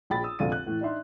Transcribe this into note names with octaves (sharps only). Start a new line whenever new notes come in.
A#1 G#4 G5 B5 A6
D#6 E6
F1 A#1 D3 F5 A6 D#7
F#6
A2 E3
D4 D#4 E5 C6